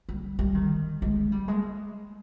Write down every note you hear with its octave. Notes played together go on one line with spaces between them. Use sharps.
G3
G3
D#3
G#3
G3
G#3